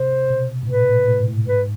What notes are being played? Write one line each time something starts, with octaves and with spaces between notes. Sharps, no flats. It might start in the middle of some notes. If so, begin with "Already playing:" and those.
Already playing: C3 C5
B2
A2
A#2 B4
A2
A2
G#2
A2
G#2 B4